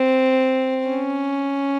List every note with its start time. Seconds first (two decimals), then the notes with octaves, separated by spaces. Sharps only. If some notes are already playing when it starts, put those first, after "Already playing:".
Already playing: C4
0.89 C#4